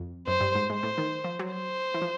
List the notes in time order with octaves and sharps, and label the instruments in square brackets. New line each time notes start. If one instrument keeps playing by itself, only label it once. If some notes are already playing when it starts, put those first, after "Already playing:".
Already playing: [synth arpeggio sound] F2
[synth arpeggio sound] F#2 [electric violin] C5
[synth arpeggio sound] G2
G#2
[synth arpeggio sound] G#2 [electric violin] C5
[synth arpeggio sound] A2
D#3
F3
F#3
[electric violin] C5
[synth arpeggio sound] E3
F3